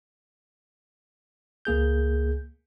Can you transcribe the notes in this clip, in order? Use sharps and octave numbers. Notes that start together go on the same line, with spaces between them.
C#2 A#3 G#4 G6